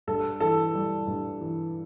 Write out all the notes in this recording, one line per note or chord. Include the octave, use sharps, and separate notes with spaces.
G2 A4
E3 A4
G3
G2
E3